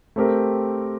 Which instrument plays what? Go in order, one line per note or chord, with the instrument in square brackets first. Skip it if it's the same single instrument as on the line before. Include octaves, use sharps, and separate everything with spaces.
[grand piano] A3 C4 G4 A#4